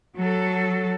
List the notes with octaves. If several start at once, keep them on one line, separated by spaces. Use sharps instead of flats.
F#3 A4